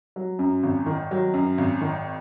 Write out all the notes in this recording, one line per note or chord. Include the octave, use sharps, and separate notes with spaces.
F#3
F#2
G#1
D#3
F#3
F#2
G#1
D#3